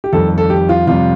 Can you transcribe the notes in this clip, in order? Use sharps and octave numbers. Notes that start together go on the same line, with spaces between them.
G4
F2 D#3 G3 A4
A4
G4
F4
F2 C3 G3 F4